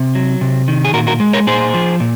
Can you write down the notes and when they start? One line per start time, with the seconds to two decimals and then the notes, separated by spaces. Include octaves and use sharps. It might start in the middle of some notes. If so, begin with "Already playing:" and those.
Already playing: C3
0.15 F#3
0.41 C3
0.68 D#3
0.85 G#4
0.94 A#2 F#4 A#4
1.07 F#4 A#4
1.20 G#3
1.33 A#4 C#5
1.47 A#2 G#4 C5
1.74 F3
2.00 A#2